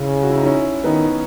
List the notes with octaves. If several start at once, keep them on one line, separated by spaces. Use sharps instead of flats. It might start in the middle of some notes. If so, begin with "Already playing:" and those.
Already playing: C#3 C#4 E4
F#4
E4
D#4
C#4 E4
D#3 B3 D#4